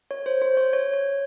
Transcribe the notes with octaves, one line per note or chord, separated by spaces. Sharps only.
C#5
C5
C5
C#5
C#5
C#5